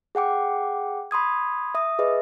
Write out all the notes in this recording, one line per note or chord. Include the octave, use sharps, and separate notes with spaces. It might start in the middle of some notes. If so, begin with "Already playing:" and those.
G#4 F#5 G5 D6
B5 C6 D#6 G#6
E5 D#6
G#4 B4 D#5 E5